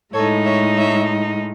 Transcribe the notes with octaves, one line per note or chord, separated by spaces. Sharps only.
A2 G#3 D#4 A4 C#5
C#5 E5
C#5 E5